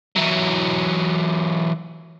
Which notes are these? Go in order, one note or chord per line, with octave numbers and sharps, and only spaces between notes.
E3 F#3